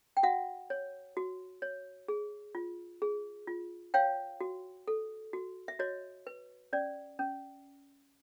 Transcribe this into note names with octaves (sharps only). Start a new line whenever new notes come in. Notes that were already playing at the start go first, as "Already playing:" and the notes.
G5
F#4 E5 F#5
C#5
F#4
C#5
G#4
F4
G#4
F4
C#5 F5 G5
F#4
A4
F#4
E5
F#4 C#5 D#5
B4
C#4 D5
C#4